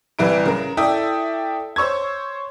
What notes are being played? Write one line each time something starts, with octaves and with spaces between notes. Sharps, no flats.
C2 E3 G3 E4 B4 D7
C#3 A#4
E4 A4 D5 E5 G5 D#6
C5 C#5 C#6 E6 G#6